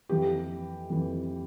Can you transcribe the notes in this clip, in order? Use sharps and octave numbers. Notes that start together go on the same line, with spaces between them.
F2 E3 G4
F2 E3